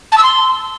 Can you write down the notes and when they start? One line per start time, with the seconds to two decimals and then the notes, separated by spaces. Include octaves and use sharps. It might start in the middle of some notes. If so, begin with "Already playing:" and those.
0.11 A5
0.17 E6
0.23 C6